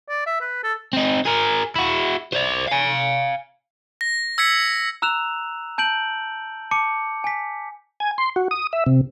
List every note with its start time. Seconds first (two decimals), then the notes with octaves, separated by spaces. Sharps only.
0.09 D5
0.26 E5
0.41 B4
0.63 A4
0.93 C4 D#4
1.25 G#4 A#4
1.76 E4 F#4
2.33 C5 D5
2.68 F5 G#5
4.01 A#6
4.38 E6 G#6 B6 C#7
5.02 A#5 E6 F#6 E7 F7
5.78 A5 G6 D7 F#7
6.71 A5 D6 C#7
7.24 G#5 B6
8.00 G#5
8.18 C6
8.36 F#4
8.51 D#6
8.73 E5
8.86 C3